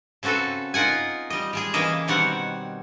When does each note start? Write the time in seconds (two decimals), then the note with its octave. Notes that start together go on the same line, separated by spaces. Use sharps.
0.23 C#3 C4 F#4 A4 B4
0.74 D#4 F4 A#4 F#5 G#5
1.30 G3 D#5
1.53 G3 G#3 G#4
1.74 C#3 E3 A#3 D#5 E5
2.08 B2 D#3 G3 C4 C#5 F#5